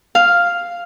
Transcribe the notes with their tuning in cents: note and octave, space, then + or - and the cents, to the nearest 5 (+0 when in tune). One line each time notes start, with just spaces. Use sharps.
F5 +0